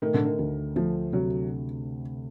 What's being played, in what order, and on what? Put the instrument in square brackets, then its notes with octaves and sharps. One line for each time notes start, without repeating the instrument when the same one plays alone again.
[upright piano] D#3 [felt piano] A3
[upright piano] D3
D#3
[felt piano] D2
[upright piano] F3 [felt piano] A3
[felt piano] C3 [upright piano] F#3